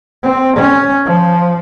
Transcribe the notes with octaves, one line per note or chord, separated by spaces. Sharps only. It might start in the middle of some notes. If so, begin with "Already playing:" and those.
C4
C#4
F3